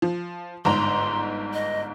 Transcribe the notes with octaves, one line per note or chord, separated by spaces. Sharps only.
F3
G1 G#2 A#5 C6
D#5